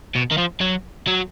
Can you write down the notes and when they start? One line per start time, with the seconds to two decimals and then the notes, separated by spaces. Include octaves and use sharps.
0.16 B2
0.31 D#3
0.38 F3
0.61 F#3
1.07 F#3